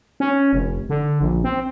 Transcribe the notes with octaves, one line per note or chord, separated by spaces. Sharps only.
C#4
F1
D3
A#1
C4